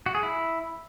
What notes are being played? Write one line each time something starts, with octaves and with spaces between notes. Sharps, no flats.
F#4
G#4
E4